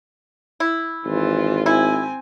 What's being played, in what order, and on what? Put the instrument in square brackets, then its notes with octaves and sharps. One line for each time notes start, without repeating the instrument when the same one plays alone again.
[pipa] E4
[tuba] G#1 [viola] E3 F4
[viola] C4 G#5 [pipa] E4